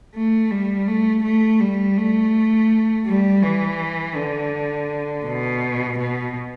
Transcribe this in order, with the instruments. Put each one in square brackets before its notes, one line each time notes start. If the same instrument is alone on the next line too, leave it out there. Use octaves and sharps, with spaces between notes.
[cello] A3
G3
A3
A3
G3
A3
G3
E3
D3
B2
B2